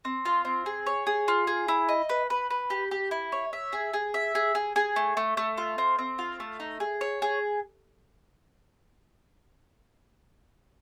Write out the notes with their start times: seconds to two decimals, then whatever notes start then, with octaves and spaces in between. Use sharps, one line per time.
0.05 C4
0.25 F4
0.45 C4
0.66 G#4
0.86 C#5
1.07 G#4
1.28 F4
1.47 G#4
1.68 E4
1.89 D#5
2.09 B4
2.30 B4
2.50 B4
2.70 G4
2.91 G4
3.11 E4
3.32 C#5
3.53 E5
3.73 G#4
3.94 G#4
4.14 E5
4.35 G#4
4.55 G#4
4.76 G#4
4.96 A3
5.17 A3
5.37 A3
5.58 F4
5.78 C4
5.99 C4
6.19 F4
6.40 A3
6.60 D#4
6.80 G#4
7.01 C#5
7.22 G#4